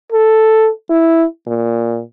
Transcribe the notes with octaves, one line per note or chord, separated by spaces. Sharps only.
A4
E4
A#2